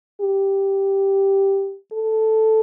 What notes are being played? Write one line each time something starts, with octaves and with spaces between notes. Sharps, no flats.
G4
A4